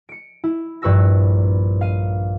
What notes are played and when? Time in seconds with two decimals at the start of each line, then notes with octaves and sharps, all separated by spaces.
0.09 C#7 D7
0.44 E4
0.82 A#1 G2 B4 C#6 E6 A#6
1.81 F5 D#7